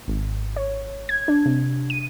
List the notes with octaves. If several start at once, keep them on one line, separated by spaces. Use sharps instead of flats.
G#1
C#5
G#6
D4
C3
D#7